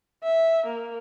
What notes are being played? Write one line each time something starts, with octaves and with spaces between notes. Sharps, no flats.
E5
A#3